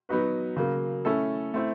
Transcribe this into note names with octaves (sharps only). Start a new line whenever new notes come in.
F#3 B3 D#4 F#4 B4
C#3 F#3 A#3
A3 C#4 E4 A4
A3 C4 E4